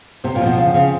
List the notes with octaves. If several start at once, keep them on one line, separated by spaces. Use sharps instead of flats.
C3 C4
A#2
F3
B2
C#3 F3
C#3 C4